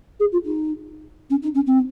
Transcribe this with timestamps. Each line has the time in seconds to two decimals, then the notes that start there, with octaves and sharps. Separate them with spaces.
0.19 G#4
0.31 F4
0.44 D#4
1.30 C#4
1.42 D#4
1.54 C#4
1.66 C4